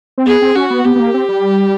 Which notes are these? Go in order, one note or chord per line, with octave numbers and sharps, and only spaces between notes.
C4
B3 G#4
C4
C#4 F#4
B3
B3 G4
B3
A#3
C4
G3